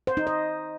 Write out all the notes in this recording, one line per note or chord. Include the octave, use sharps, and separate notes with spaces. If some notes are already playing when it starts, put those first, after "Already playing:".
C5
D#4
D#5